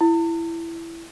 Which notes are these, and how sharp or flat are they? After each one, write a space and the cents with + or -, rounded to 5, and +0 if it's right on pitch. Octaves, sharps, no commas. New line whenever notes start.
E4 +10